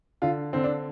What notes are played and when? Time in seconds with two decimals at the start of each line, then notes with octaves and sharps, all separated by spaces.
0.22 D3 F4
0.53 D3 C4
0.64 D4